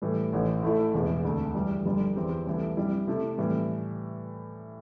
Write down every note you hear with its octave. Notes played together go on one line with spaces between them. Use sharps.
A2 E3 G3
A1 A2 E3
A2 A3 E4
E1 E2 C3 E3
D2 D3 A3
G2 E3 G3
G1 G2 G3
E2 E3 C4 G4
C2 C3 E3 A3
G2 G3 E4
C3 A3 E4
A2 E3 G3